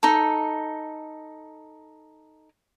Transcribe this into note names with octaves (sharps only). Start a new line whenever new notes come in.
D#4 A4